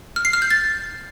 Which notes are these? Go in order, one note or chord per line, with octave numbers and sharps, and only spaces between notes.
F6
C7
F6
G6
A6